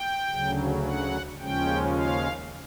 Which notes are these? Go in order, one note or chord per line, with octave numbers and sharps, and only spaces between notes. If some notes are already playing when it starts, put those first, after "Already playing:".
Already playing: G5
D2 C#3 F#3
F#5
D#2 C#3 F3 G#3 C#4 G5
F5